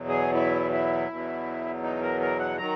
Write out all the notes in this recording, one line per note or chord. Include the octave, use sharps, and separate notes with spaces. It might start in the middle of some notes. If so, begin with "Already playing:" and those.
Already playing: E2 B2 F#3
G#4
E4
E4
E2 B2 F#3
D#4
A#4
A#4
F#5
D#3 F#3 A#5